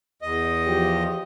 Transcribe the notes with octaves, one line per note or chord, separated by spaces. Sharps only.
E2 D#5
F3 G4